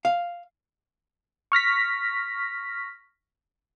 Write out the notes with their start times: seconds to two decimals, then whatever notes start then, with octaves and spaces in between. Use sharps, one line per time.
0.05 F5
1.52 C#6 F6 A#6 B6